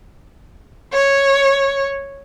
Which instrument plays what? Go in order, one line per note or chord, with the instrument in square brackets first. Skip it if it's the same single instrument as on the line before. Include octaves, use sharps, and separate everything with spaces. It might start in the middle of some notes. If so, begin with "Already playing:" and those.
[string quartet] C#5